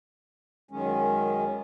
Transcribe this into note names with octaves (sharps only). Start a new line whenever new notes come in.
F#2 D#3 G#3 C#4